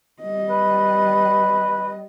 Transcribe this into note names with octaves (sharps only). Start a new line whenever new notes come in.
G3 D#5
B4